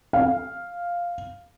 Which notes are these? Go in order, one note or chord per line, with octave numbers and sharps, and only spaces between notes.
F5